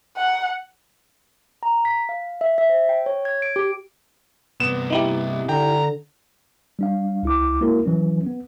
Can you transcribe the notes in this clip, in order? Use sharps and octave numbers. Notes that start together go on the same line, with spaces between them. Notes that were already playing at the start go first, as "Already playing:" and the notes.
F#5
A#5
B6
F5
E5
E5
C5
G5
C#5
G#6
D7
G4
G2 C3 B3 E7
D#4 E4 G4
D3 G5 A#5
G3 D4 F5
C#2 E4 D6
G#3 A#3 E4 F#4 A#4
E3 F#3 C#4
B3